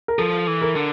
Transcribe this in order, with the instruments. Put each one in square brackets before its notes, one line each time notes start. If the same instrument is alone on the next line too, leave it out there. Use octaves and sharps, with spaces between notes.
[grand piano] A#4
[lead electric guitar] F3 [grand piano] A4
[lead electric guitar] E3
[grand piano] A#4
[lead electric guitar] D3